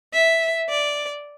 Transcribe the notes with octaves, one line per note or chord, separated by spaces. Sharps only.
E5
D5